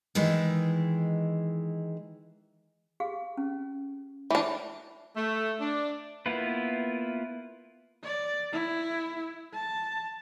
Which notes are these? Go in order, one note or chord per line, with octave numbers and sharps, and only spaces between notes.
D#3 E3 G#3 E4
G4 G#4 F5
C#4
E3 D4 C#5
A3
D4
A#3 B3 E4 F4 B4
D5
E4
A5